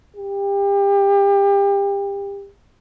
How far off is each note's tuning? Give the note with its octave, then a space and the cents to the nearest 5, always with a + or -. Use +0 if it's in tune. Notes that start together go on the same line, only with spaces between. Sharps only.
G4 +30